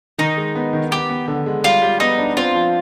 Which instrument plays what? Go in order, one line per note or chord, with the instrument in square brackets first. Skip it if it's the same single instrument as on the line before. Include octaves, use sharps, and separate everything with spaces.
[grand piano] D#3 [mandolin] D#4
[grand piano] G#3
B3
D#3
[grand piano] B3 [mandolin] G4
[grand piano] B3
D3
G#3
[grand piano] G3 [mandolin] F4
[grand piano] G3
[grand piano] B3 [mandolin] D#4
[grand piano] D4
[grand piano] C4 [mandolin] F4
[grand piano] F3